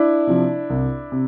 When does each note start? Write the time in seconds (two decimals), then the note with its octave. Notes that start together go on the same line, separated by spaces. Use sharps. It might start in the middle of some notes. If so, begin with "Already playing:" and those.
Already playing: D4 E4
0.27 C3 F3
0.70 C2
1.12 C3